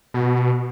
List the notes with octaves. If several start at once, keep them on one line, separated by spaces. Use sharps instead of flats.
B2